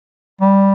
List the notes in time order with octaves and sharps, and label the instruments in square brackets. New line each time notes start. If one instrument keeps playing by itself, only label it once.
[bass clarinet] G3